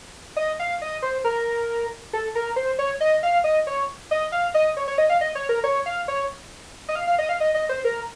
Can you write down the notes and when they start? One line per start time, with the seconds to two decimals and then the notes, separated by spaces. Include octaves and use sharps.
0.37 D#5
0.60 F5
0.82 D#5
1.02 C5
1.24 A#4
2.13 A4
2.35 A#4
2.56 C5
2.79 C#5
3.01 D#5
3.23 F5
3.44 D#5
3.67 C#5
4.11 D#5
4.32 F5
4.54 D#5
4.77 C#5
4.88 C#5
4.98 D#5
5.10 F5
5.21 D#5
5.35 C#5
5.49 A#4
5.64 C#5
5.86 F5
6.08 C#5
6.89 D#5
6.95 F5
7.07 F5
7.19 D#5
7.29 F5
7.40 D#5
7.54 D#5
7.69 C5
7.85 A#4